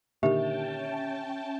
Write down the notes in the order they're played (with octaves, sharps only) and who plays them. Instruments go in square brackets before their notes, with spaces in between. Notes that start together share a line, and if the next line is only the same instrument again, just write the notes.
[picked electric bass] A#2 D3 D#3 [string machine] C#4 G5 A5 [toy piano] G4 [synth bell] E5